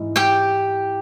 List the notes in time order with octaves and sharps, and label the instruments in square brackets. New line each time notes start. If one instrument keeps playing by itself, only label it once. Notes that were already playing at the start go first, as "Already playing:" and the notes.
Already playing: [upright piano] G#2 E3 G#3 E4
[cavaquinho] G4 G5